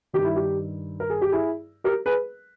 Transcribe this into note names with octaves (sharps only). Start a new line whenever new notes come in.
G2 D#3 G4
E4
G4
A#4
G#4
G4
E4 G#4
G4 A#4
G#4 B4